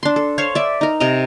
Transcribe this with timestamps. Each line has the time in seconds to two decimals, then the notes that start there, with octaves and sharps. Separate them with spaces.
0.03 D4 C6
0.16 A4
0.38 C5 C#5 F5
0.55 D5 E5
0.81 D#4 A#4
1.00 C3 A#4 D#5 A#5